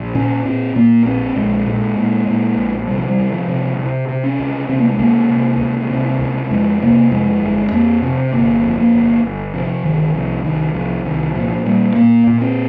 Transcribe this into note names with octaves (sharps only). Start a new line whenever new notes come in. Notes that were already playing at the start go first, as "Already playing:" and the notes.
Already playing: A#1
A#2 C#4
A#2 C4
A#2 A#3
A#1 C4
A#1 G#3
A#2 G#3
A#2
A#2
A#1
C3 G3
F3
G3
C#2
F3
C3
C3
C3
C#4
C#2
C3 C4
A#3
G#3
C#2 A#3
C3
C#2
C3
C#2
F2 G#3
C3 A#3
F2 G#3
G1 G#3
F2 A#3
C3 C4
G1 A#3
F2
A#3
G1
G1
C3 F3
G1 D#3
C2 F3
C2 D#3
C2 F3
C2 D#3
A#2 F3
A#2 G3
A#2 A#3
A#2
C4